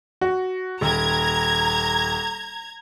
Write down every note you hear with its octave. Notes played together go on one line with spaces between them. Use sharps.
F#4
D#1 A#5 G#6